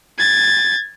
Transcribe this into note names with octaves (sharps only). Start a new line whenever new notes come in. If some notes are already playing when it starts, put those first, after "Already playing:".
G#6 A6